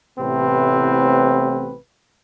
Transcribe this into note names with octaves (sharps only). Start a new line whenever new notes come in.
A1 A2 C3 B3 C4 B4